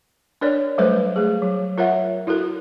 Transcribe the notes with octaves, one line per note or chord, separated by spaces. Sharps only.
D4 A#4 C#5 D5
F#3 G3 A3 A4 B4 C5
A3 G#4
F#3
F4 A#4 C#5 E5 F#5
E4 F#4 A4 A#4